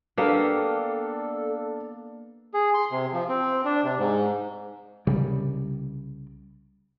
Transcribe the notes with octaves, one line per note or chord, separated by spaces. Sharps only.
A#3 B3 D4 G4 A4 D5 F5
G#4
C6
C3
F3
C4
D4
C3
G#2
C2 C#3 G3